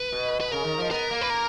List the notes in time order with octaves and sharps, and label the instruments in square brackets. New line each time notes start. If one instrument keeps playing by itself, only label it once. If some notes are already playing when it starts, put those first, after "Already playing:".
Already playing: [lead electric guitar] B4
[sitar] B2
[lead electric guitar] B4
[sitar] C#3 [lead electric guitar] A#4
[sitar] D#3
F3
[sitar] B3 [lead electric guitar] A#4
[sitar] A#3
[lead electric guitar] B4
A#4